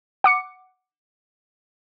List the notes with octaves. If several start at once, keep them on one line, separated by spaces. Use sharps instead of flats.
F#5 D6 C#7